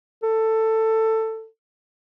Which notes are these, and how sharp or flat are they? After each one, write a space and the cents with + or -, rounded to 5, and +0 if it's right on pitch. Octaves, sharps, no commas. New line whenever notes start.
A4 +15